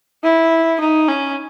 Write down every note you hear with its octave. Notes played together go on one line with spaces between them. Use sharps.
E4
D#4
C#4